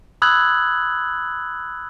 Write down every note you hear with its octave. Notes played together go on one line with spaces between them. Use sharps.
B5 D#6 E6 F#6 G#6 F#7